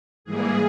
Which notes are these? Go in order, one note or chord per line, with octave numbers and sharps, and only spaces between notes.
G#2 E3 G3 A#3 G#4